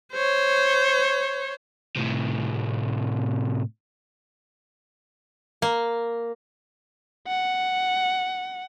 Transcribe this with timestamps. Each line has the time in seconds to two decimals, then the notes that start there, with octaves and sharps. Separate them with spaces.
0.13 C5 C#5
1.96 A2 C3
5.62 A#3
7.27 F#5